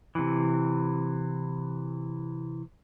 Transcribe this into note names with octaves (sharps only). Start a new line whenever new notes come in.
C3 E3